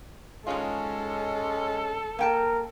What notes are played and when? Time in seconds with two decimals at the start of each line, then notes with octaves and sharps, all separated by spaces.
0.47 G#2 G#3 C#4 F4 A4
2.19 A#3 A#4 G5 A5